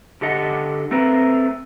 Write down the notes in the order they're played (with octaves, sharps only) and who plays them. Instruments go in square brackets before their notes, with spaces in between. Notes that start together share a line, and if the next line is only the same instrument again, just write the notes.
[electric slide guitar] D3 G4 A4 D#5 F#5
A3 C4 A#4 B4